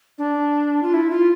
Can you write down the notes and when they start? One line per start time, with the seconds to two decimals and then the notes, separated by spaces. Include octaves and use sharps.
0.18 D4
0.83 F4
0.94 E4
1.11 F4